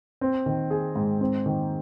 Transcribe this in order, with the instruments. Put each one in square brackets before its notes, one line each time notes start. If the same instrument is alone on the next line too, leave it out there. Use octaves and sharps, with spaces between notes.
[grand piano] C4
D#3
G#4
G#2
C4
D#3